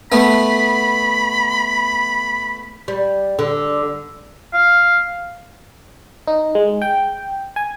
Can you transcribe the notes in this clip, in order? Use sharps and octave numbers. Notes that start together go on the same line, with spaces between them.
A3 B3 B5
G3
D3
F5
D#4
G#3
G5
G#5